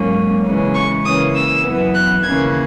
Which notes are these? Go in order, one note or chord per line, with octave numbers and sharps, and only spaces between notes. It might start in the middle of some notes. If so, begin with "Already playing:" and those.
Already playing: G#2 F#3 A#3 C#4
C#3 E3 G#3 C#4
C#6
C#3 E3 A#3 C#4 D#6
E6
F#2 E3 B3
F#6
D#2 C#3 E3 A#3 C#4 G#6